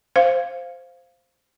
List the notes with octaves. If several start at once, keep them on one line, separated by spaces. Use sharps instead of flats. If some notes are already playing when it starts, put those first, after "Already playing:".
C5 F5